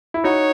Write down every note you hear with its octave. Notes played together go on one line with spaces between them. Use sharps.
E4
D#4 F#4 C#5